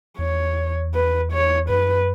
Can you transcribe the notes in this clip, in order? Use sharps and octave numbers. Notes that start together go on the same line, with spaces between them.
E2 C#5
B4
C#5
F#2 B4